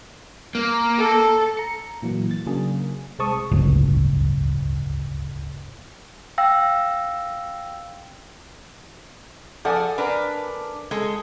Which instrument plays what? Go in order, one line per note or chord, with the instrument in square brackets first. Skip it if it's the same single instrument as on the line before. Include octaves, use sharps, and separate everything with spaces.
[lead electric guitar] A#3
[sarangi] A4
[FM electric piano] A#5 C#7
A#2 E3 F#3 A#3
A6
C#3 F#3 A#3 D4 G#4
C2 G#3 C4 A5 C#6 D#6
[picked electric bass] D1 G1 C#2
[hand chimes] F5 G5 E6 A#6
[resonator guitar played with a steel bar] F3 F#5 [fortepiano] A4 D5 G#5
[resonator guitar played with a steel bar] D4 A#4 B4
G#3 G#4 A4